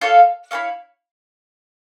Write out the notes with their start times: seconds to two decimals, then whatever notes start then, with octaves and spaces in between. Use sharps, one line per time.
0.01 F4 A4 C#5 F5
0.51 E4 A4 C#5 F5